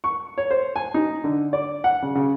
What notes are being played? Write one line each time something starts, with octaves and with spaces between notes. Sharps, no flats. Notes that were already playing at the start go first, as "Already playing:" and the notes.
C#6
C#5
C5
G#5
D#4
D3
D5
F#5
C#3
C#3